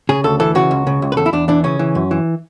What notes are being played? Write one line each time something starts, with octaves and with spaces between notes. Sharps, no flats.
C#3 G#4
D2 A4
E3 A4
C#3 F#4
C#2
C#3
C#2
B4
E2 A4
E4
E2 D4
E3 D4
C#3 C#4
E3
F#2
E3